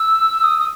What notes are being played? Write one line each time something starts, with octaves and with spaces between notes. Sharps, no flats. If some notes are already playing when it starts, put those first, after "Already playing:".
Already playing: E6
D#6
D#6